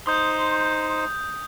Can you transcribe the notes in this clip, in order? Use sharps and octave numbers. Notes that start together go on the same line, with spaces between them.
D#4 C5 C6 D#6 G6